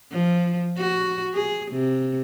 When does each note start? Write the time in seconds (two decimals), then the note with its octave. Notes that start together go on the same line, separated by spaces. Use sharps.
0.12 F3
0.78 F#4
1.34 G#4
1.71 C3